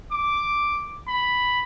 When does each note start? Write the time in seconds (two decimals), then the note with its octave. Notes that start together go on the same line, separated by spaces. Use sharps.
0.11 D6
1.08 B5